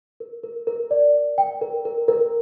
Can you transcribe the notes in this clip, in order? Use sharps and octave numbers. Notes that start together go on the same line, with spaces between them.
A#4
A#4
A#4
D5
D5
G5
A#4
A#4
A#4